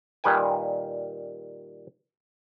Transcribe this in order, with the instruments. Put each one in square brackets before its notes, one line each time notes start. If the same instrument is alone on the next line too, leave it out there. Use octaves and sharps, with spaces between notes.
[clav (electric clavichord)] A#2 D#3 G3 B4 G5 G#5